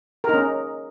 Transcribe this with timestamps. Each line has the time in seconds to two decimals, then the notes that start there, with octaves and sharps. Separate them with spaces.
0.24 A#4
0.29 D#4
0.34 C#4